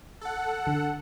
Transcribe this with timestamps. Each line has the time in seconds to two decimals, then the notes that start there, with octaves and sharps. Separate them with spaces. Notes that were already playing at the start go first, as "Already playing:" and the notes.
0.21 A4 F#5
0.67 D3